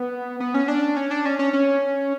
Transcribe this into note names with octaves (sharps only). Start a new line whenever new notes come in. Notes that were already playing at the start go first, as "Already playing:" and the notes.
Already playing: B3
B3
C#4
D4
C#4
D4
C#4
C#4
C#4